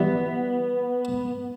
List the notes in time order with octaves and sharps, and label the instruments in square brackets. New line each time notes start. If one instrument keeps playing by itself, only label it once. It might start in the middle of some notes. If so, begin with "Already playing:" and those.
Already playing: [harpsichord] E3 G3 E4 [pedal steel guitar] B3